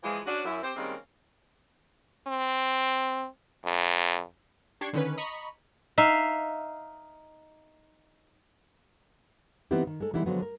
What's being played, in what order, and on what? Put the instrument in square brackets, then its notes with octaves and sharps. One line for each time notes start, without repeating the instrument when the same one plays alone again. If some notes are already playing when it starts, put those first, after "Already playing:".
[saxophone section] E3 F3 G#3
C#4 D4 F#4
F#2 E4
C4 G4 C5
D#3 G3 G#3 A#3 C4 C#4
[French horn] C4
F2
[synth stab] D4 G4 C#6 G#6 C7
D3 D#3 C#4 B4
D#5 A#5 B5 C#6
[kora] D#4 E5 F5
[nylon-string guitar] E3 B3 C4 D#4 E4 G4
D#3
G#3 A4
E3 G3 G#3 B3 D#4 E4
D3 F3 F#3 G#3 B3
A#4